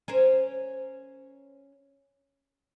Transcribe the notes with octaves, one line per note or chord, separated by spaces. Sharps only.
C#4 A#4 C5